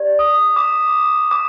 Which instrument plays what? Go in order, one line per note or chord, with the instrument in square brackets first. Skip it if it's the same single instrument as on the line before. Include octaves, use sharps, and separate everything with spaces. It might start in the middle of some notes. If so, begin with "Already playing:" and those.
Already playing: [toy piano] G4 D5
[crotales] D#6
D6
D6